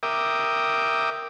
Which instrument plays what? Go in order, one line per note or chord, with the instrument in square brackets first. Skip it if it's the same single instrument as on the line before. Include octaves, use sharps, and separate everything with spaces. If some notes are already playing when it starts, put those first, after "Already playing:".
[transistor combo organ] A#4 E5 G5 D6 D#6